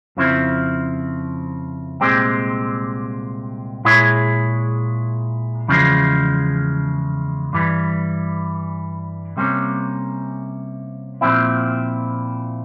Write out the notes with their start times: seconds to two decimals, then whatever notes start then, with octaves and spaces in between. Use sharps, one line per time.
0.17 F2 C#3 F3 C4 E4
2.00 C2 A#2 G#3 C4 G4
3.85 A#2 G#3 E4 G#4 C#5
5.68 E2 C#3 F3 G#3
7.53 G2 E3 G3
9.37 C3 G3 A#3 C#4
11.21 A#2 F3 C4 E4